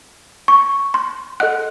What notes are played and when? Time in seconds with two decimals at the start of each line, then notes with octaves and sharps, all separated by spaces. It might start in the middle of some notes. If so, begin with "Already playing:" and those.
0.48 C#6
0.94 C6
1.40 A4 D#5 F#5 F#6